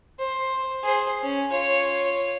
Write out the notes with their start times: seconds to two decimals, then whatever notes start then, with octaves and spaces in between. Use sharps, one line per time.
0.19 C5
0.83 G#4 C5
1.22 C#4
1.51 F4 C#5